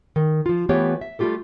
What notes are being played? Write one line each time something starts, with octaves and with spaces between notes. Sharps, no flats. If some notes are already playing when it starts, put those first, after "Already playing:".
D#3
F3 F4
E3 A3 B3 F4 G4 C#5
E5
G3 A3 A#3 F4 G4 A4